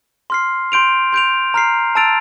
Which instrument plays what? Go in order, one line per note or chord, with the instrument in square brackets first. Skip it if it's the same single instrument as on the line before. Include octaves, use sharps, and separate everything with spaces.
[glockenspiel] C6 F6 C7
C6 G6 D7 F7
C6 G6 D7 F7
A#5 F6 C7
A5 E6 A6 D7 F7